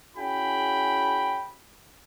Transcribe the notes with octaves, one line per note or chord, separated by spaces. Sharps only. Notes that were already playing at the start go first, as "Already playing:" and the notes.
C#4 E4 F#4 G#4 G5 B5